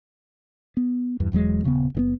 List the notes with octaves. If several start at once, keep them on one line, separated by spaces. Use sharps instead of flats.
B3
E2 G2 E3
E1 E2 F#3 G#3
D#1 C#3 A#3 B3
F#1 C#3 B3